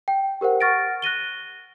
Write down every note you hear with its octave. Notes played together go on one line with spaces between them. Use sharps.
G5
G4 A#4 C5 F#5
F#5 C#6 F6 A6 A#6 D7
F#6 A#6 D#7 G7